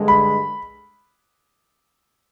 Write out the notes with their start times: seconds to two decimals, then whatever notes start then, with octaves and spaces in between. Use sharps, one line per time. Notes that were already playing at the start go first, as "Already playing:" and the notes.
Already playing: G2 D3 G#3
0.08 B5